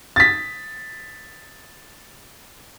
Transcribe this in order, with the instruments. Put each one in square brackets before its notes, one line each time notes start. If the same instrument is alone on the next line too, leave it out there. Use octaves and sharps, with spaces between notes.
[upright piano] A6 B6